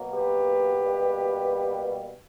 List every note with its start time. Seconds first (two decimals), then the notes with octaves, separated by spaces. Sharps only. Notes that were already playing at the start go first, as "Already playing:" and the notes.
Already playing: B2 F#3 A#3
0.13 G4 B4
0.80 B2 G3 A#3